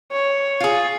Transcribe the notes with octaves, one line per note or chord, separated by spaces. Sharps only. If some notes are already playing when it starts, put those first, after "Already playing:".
C#5
F4 G#4